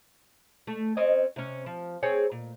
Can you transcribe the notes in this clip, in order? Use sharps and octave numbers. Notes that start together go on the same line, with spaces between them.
A3
C4 C#4 D#5
C3 C#4
F3
C4 G#4 C#5
A#2